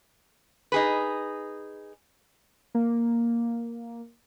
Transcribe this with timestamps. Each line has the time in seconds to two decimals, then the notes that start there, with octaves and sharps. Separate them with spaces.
0.72 D#4 G#4 B4
2.75 A#3